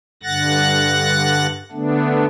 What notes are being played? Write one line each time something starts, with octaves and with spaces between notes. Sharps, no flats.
G2 D3 F#5 F#6 A6 A#6
D3 A3 B3 D4